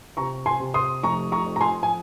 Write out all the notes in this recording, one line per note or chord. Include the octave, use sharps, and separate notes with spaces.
C3 A#5 C#6
G#5 C6
C3
C6 D#6
F1 A#5 C#6
A#5 C#6
F2
A#5
G#5 C6
G#5